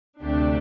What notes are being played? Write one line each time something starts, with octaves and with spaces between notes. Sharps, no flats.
D2 C3 A3 D4 G4